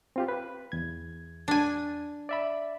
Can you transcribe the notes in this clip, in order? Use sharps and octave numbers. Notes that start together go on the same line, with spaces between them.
C4 F4 G4
B4
E2 G#6
D4 G#5
D5 E5 B5